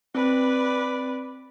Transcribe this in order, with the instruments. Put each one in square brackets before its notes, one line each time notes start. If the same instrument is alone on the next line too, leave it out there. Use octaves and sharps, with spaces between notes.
[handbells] C4 [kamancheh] B4 D5